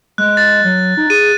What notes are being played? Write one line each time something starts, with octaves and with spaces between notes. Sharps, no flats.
G#3 F#6
A6
F#3
D#4
G#4 D#7